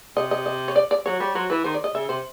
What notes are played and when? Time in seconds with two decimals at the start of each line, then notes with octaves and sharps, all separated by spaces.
0.16 C3 D#5
0.31 D#5
0.46 D#5
0.68 C#5
0.76 D5
0.91 D5
1.06 F#3 C#5
1.20 G3 C#5
1.35 F#3 C5
1.50 E3 B4
1.64 D#3 C5
1.74 D5
1.84 D#5
1.94 C#3 E5
2.08 C3 C5